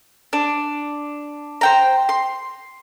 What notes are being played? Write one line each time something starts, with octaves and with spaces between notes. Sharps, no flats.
D4
C5 G5 A#5
C6